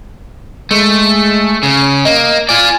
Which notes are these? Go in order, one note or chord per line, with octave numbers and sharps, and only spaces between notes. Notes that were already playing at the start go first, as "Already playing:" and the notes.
G#3 A3
C#3
A#3 D#5
F4 D5 G#5